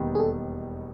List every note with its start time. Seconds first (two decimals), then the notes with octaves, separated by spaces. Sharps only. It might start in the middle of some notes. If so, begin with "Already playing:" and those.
Already playing: E1 D#2 D#3 G3 B3
0.15 G#4
0.20 A4